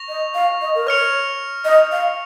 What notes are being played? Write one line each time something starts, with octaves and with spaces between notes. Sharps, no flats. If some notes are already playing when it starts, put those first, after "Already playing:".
Already playing: C#6 A#6 F7
D#5
F5
D#5
A#4
C#5 C#6 F6 C#7 F7
D#5
F5